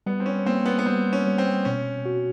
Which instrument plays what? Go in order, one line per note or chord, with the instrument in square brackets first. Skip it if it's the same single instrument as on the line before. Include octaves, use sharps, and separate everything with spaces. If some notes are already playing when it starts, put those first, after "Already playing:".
[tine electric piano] G3 [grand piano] B3
[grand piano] C4
C#4
[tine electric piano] A#3 [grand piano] C4
[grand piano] B3
B3
[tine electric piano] G3 [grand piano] C4
[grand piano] C#4
[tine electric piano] G3
[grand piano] C4
[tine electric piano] B2 [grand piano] C#4
[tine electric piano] F#4